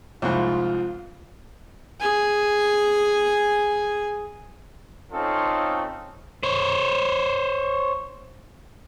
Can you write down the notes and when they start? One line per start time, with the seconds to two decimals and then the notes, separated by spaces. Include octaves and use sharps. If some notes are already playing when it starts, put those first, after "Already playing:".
0.22 C2 F2 G#2 F4
2.00 G#4 G#5
5.12 A3 C4 C#4 D#4 F4 A4
6.43 C5 C#5